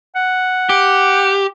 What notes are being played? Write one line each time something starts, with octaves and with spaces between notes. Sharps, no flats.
F#5
G4